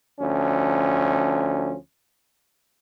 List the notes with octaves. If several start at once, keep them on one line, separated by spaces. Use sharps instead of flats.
D2 F3 C#4